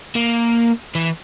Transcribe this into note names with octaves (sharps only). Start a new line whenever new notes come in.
A#3
E3